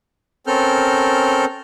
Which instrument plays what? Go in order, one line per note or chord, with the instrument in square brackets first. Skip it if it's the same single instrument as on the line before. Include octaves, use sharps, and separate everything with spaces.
[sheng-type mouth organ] C4 C#4 A4 A#4 F6 G6